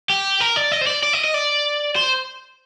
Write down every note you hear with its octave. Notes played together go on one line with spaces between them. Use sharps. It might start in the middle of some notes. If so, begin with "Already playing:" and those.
G4
A#4
D5
D#5
C5
D5
D5
D#5
D#5
D5
C5